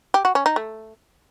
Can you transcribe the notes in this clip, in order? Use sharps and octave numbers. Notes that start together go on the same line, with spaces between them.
G4
F#4
C#4
D#4
A3